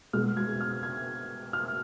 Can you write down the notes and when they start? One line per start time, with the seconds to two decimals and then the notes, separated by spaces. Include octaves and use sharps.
0.13 B2 G#3 F6
0.37 G#6
0.61 F6
0.83 G#6
1.53 F6